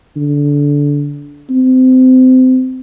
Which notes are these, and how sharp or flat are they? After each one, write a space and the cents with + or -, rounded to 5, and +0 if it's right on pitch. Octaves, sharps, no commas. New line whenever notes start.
D3 -20
C4 -25